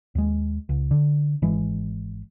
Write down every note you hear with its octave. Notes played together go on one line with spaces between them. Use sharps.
D#2 G#3
C#2
D3
G#1 E3 G#3